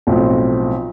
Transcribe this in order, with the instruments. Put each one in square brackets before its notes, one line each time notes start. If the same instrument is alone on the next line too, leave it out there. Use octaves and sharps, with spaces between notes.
[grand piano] B1 A2 F3 C4